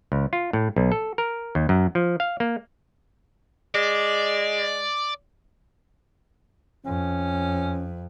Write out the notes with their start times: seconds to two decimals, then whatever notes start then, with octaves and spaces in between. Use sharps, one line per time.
0.12 C#2
0.33 F4
0.53 A2
0.76 B1
0.92 A4
1.18 A#4
1.55 D#2
1.69 F#2
1.95 F3
2.20 F5
2.40 A#3
3.75 G#3 D5
6.85 F2 C#4